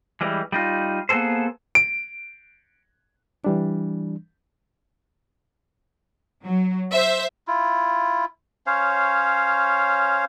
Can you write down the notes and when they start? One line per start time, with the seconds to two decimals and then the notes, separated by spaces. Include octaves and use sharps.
0.21 E3 G3 G#3
0.52 G3 D#4 F4
1.09 A#3 B3 G#4 A4 C5
1.75 D7
3.44 E3 G3 D4
6.44 F#3
6.91 C5 E5
7.47 E4 F4
8.67 C#4 C5 C#5 F5